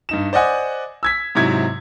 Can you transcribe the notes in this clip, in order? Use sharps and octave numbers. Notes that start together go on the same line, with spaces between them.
G2 D#4 E7
C5 D5 D#5 F#5 G#5
E6 G#6 B6
G#2 C3 F#3 E4 G#6